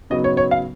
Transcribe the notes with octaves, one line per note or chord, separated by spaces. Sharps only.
C#3 F#3 B3 D#4 D#5
C#5
C#5
F5